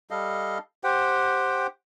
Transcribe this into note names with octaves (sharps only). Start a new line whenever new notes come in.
G3 A4 D#5 F5
G4 C5 F#5 G5